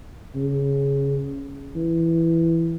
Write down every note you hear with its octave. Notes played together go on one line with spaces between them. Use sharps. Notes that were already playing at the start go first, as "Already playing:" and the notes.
C#3
E3